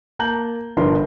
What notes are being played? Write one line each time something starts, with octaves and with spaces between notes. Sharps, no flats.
A#3 A5 A#5 G6 F#7
G1 F3 D4 A#4 B4 C6